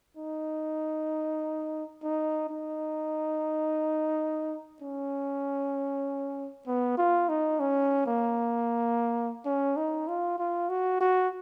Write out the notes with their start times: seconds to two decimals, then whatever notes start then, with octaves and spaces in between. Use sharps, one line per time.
0.17 D#4
2.03 D#4
2.49 D#4
4.82 C#4
6.67 B3
6.98 F4
7.29 D#4
7.60 C#4
8.06 A#3
9.46 C#4
9.76 D#4
10.08 F4
10.39 F4
10.69 F#4
11.01 F#4